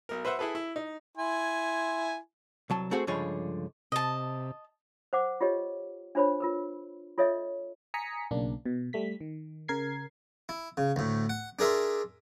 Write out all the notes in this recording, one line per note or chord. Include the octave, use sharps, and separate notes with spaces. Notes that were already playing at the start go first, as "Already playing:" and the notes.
B1 A#4
B4 C5 E5 F#5
E4 G#4 A4 B4
E4
D#4
E4 G#5 C6
C2 F#3 A5
A3 C4 F#4 G#4 C5 F#5
C#2 G2 D3 F3 G#4 C#5
C3 D#5 A5
C5 F#5 D6
F4 G4 C#5 D#5
D4 F4 C5 C#5 B5
F4 A#4 B4
F4 A4 C#5 D#5 E5
G#5 A#5 D#6 B6 C#7
B1 C#3 A#3 D4
B2
G3 A3 B6
D#3
C#3 A#4 G#6 C7
E4
C#3
D2 A2
F#5
D4 G#4 A#4 E5 C6